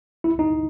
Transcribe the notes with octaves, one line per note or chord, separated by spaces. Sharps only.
E4
D#4